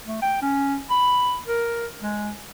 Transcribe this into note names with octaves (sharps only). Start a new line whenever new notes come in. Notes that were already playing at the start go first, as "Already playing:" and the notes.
A3
G5
C#4
B5
A#4
G#3